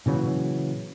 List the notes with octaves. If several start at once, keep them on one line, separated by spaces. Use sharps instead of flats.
A#2 C#3 E3 F#3